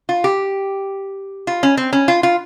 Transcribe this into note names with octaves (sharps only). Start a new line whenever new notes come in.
F4
G4
F4
C#4
C4
C#4
F4
F4